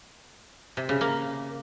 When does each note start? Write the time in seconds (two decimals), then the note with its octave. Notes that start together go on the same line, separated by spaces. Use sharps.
0.77 C3
0.89 C#3
1.01 A#3